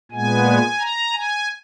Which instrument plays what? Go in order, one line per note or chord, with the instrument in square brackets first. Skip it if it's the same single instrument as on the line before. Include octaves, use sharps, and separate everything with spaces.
[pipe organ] A#2 G#3 B3 G#5
A#5
G#5